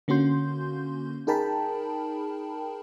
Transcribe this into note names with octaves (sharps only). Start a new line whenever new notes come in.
D3 A#3 C#4 F#4 C6 G6
D#4 G#4 A#4 G5 A5 B5